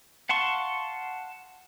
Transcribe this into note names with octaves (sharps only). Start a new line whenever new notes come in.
F5 F#5 A5 C6 C#6